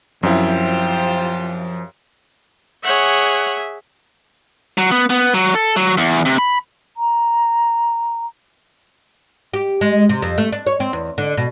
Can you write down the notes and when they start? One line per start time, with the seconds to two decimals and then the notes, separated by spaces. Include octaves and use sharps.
0.23 F#2 F3 C4 E4 F4 G4 C5
2.84 G#4 C#5 E5 F#5
4.78 F#3
4.91 B3
5.10 B3
5.34 F#3
5.55 A4
5.76 F#3
5.98 E2
6.25 C3
6.38 B5
6.97 A#5
9.53 G4
9.81 G#3
10.09 C3
10.22 F2
10.38 A3
10.52 D4
10.67 C#5
10.80 C4
10.93 E2
11.18 D3
11.37 B2